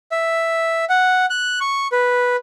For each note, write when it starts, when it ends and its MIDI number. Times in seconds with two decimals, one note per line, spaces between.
0.12 0.85 76
0.90 1.26 78
1.30 1.59 90
1.61 1.88 85
1.92 2.36 71